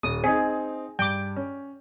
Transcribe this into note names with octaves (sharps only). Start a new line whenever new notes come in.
D#1 D#6
C4 D#4 G#4
G2 G5 D6
C#4